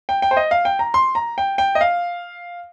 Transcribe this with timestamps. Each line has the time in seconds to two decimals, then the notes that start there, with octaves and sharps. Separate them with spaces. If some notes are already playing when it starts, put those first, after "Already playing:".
0.09 G5
0.22 G5
0.31 C5
0.37 D#5
0.51 F5
0.65 G5
0.79 A#5
0.94 C6
1.15 A#5
1.38 G5
1.58 G5
1.75 D#5
1.81 F5